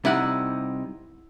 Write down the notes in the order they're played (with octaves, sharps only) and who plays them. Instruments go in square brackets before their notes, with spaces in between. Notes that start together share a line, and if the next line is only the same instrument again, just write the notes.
[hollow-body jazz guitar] C3 G3 D#4 [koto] E4 F#5